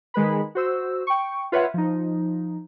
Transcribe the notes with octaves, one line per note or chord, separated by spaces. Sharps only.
D#3 G#3 B4 B5
F#4 C5 E6
G5 C#6
F4 B4 C#5 E5 F#5
F3 D#4